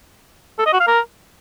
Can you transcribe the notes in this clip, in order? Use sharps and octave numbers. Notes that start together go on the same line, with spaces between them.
A4
D#5
F#4
F5
A#4